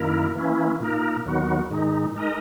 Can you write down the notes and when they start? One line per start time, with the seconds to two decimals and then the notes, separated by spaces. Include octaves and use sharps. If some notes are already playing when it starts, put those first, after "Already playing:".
Already playing: F#2 D#3 A#3 E4 A#4
0.35 E3 A#3 C#4 E4
0.80 A#2 A#3 D#4 A#4
1.25 D#2 D#3 F#3 B3 F#4
1.70 G#2 D#3 G#3 D#4
2.15 G#3 D#4 A#4 D#5